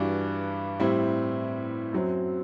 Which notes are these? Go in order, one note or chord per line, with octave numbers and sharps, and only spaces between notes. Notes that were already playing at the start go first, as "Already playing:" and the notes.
Already playing: G2 E3 G3 D4 F#4
A2 G3 C4 E4
F#2 F#3 C4